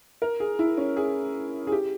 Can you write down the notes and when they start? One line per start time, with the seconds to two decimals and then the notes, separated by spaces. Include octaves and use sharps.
0.22 A#4
0.40 G#4
0.59 E4
0.77 C#4
0.96 G#4
1.67 G#4
1.72 G4